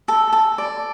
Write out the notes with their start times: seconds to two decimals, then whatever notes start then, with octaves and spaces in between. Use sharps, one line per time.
0.08 A4
0.33 A4
0.58 D5